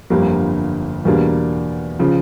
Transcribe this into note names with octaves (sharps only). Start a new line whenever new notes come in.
G1 F2 D3 G3 A#3
E2 B2 G3 A#3 D4
C#3 F3